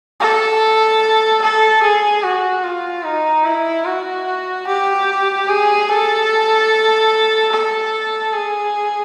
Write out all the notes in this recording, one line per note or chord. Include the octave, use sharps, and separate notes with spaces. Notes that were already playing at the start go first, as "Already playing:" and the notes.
A4
A4
G#4
F#4
F4
D#4
E4
F#4
G4
G#4
A4
A4
G#4